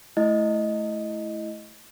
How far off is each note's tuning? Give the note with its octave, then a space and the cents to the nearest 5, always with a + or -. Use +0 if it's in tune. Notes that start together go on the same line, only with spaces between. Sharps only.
A3 -20 E4 +0 D#5 +0